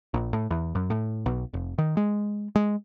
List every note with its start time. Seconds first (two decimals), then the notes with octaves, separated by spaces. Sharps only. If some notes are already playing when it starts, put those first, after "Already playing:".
0.14 A#1
0.33 A2
0.51 E2
0.75 F#2
0.90 A2
1.26 B1
1.54 F1
1.78 D#3
1.97 G#3
2.55 G#3